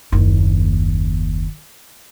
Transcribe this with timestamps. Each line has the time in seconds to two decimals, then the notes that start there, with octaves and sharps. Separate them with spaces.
0.12 F#1 D#2